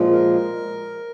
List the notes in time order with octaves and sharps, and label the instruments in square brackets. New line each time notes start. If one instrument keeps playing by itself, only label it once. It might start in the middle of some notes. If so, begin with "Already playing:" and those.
Already playing: [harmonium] A#2 F3 G#3
A#4